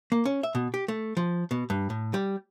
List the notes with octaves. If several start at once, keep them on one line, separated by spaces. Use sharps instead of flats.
A#3
C#4
E5
B2
G4
A3
F3
B2
G2
A2
G3